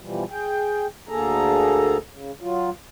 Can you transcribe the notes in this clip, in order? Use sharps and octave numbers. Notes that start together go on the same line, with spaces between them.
B2 E3 F3 G3
G#4 G5
D2 D3 A#3 G#4 A4 A#5
C#3
F#3 F4